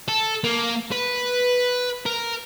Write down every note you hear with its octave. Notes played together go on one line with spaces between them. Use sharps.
A4
A#3
B4
A#4